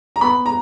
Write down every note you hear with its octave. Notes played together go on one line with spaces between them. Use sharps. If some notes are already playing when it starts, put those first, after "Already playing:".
A#5
B3 B5
A#5